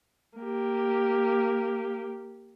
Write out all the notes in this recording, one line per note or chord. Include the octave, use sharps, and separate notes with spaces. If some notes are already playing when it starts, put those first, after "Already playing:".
A#3 G4